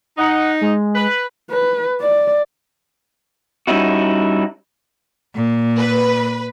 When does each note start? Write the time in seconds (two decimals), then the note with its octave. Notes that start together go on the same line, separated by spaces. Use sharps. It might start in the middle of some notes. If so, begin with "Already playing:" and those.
0.18 D#4 F#5
0.61 G#3
0.96 B4
1.51 B4
2.01 D5
3.67 G3 C#4 D#4 E4 F#4
5.35 A#2
5.79 B4